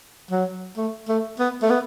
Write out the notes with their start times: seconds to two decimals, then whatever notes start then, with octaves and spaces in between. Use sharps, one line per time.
0.31 F#3
0.77 A3
1.09 A3
1.39 B3
1.63 A3
1.70 B3